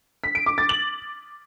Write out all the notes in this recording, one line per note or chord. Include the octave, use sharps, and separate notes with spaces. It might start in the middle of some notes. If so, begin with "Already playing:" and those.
B6
D7
D6
A6
F#7